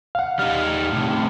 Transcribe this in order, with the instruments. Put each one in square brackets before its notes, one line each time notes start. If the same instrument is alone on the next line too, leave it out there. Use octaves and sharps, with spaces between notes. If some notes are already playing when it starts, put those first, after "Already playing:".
[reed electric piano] F5 F#5
[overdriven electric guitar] G3 D#4 [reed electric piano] F6
[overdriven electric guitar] A2 C3